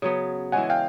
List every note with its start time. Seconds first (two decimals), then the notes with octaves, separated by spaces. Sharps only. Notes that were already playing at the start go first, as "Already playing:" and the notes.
0.02 C#3 F#3 B3
0.52 E3 G#3 C#4 F#5 G#5
0.70 F5 G5